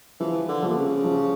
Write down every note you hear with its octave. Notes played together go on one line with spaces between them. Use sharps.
E3 F3
D3
A#2 F3
C#3
F3